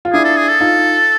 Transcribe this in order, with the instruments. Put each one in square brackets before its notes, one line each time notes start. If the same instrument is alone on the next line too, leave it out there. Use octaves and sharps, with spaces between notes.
[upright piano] F4
[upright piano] D4 E4 [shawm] G#4
[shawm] A4
G#4
A4
[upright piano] D#4 F4